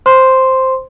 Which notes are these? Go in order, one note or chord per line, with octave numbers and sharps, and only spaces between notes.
C5 C6